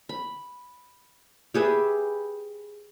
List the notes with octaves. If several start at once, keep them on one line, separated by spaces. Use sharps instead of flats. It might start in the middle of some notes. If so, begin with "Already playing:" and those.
B5
G4 G#4 B4 E5